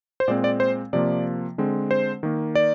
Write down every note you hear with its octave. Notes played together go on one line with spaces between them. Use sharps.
C5
A#2 G#3 C4 D5
D5
C5
C3 F3 A#3 D5
D3 G#3 C4
C5
D#3 A#3
D5